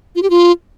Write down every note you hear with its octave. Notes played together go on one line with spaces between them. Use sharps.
F4
G4
F4